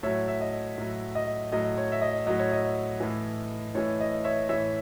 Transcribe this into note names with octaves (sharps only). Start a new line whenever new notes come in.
A2 F#3 C#5 E5
E5
D#5
A2 F#3
D#5
A2 F#3 D#5
C#5
E5
D#5
A2 F#3 D#5
C#5
D#5
A2 E3
A2 E3 C#5
D#5
C#5 E5
A2 E3 C#5 E5